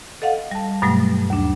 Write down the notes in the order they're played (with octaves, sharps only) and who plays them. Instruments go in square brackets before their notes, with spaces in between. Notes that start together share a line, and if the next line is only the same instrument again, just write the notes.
[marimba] A4 D#5 F5 F#5
G3 A5
G2 B2 F#3 G3 A3
D#2 D4